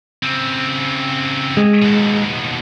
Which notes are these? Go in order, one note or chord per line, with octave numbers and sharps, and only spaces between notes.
C#3 C4
G#3
D#2 B2